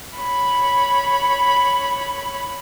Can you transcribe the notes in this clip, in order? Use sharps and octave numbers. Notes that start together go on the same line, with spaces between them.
C#5 B5